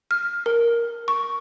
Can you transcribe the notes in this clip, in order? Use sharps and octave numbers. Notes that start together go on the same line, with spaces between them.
F6
A#4
C#6